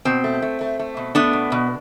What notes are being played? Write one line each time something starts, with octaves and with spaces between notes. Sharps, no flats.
B2 C4
A3
A3
A3
A3
B2
A3 B3 D4
B2
B2